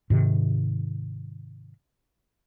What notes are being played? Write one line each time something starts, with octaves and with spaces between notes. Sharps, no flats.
G#2 C3 D#3